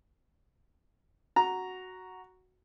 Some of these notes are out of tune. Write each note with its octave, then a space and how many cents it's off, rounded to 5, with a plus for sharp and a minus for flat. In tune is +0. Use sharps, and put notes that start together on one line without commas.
F#4 +0 A#5 +0